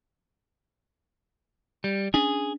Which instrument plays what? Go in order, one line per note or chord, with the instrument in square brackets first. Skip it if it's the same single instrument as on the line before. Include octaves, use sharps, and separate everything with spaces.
[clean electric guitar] G3
[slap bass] C#4 D4 [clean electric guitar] G#4